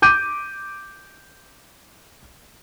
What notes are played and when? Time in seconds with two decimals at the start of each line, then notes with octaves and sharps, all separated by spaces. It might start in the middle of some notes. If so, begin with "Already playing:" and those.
0.02 D6 G6 D#7